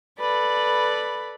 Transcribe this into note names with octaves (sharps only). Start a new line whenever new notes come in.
A4 B4 D5 B5